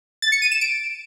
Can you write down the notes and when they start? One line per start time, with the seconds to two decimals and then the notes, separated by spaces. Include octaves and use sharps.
0.22 A6
0.32 C#7
0.42 D#7
0.52 E7
0.61 D7